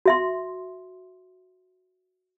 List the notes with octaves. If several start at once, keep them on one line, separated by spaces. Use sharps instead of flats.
F#4 E5 C6